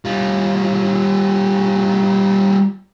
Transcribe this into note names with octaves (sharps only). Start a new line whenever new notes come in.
G3 F4